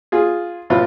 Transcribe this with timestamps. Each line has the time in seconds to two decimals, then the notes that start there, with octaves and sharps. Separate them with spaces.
0.12 F4 G#4
0.70 A2 C3 F4 B4